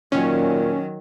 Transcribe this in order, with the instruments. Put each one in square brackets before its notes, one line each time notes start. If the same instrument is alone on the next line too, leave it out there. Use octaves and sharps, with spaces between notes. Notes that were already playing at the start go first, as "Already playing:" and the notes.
[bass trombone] A#2 [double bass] D#3 F#3 [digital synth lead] C#4